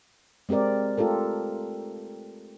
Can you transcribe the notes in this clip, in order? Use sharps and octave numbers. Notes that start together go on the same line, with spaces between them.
G#3 C4 G4 A#4 D5
A3 F4 G4 A4 A#4